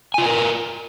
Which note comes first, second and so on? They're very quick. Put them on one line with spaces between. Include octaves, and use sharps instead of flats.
G#5 F4 B4 A#4